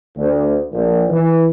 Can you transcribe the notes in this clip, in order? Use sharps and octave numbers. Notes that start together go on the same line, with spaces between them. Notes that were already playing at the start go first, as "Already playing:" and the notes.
D2
A#1
E3